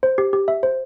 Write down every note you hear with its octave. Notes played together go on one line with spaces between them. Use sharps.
C5
G4
G4
E5
C5